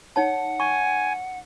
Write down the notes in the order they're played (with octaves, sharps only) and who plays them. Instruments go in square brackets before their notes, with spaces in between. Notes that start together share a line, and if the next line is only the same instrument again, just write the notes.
[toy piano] D#4 C#5 A5 [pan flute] F#5
[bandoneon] G#5 [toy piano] C#6